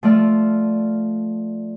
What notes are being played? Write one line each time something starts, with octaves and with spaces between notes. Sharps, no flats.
F3 A3 D5 F6